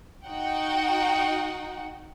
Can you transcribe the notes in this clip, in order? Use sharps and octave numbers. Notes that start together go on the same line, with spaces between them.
D#4 F#4 F#5 G5